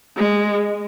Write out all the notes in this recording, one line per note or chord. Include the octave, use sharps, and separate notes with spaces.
G#3